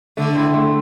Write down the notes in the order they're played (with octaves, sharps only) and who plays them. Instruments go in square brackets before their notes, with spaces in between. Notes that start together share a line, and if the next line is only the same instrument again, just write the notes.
[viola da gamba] D3 [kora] A3
[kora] C4 E4
A3